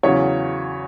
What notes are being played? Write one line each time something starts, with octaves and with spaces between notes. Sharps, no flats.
E2 C#3 F#3 C#5